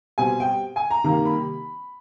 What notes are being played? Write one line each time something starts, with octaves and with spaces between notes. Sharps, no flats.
B2 G3 C4 G#5
G5
G#5
A#5
C3 D#3 G3 A#3 A#5
B5